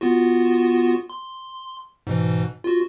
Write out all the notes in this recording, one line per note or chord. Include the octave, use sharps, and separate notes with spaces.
B3 F4 F#4
C6
G#2 B2 E3
F4 F#4